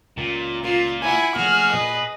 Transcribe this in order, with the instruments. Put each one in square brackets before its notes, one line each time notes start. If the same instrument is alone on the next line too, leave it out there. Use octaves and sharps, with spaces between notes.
[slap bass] C#2 [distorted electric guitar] A#2
[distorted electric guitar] A#2 [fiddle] F4
[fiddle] E4 F#5 [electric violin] G#5
[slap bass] F3 A3 A#3 [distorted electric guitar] F#4 [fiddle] G#4 [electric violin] F6
[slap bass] A#2 A#3 [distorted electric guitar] B4 [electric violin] D#5